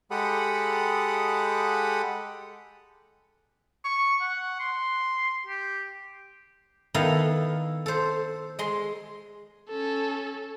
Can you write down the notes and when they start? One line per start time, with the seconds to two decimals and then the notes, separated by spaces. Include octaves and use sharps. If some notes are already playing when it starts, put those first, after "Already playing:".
0.11 G#3 G4 A4 F#5 B5 D#6
3.85 C#6
4.21 F#5
4.60 C6
5.47 G4
6.94 D#3 B3 E4 A4 F5 B5
7.86 A4 C5
8.59 G#3 C6
9.69 C#4 A4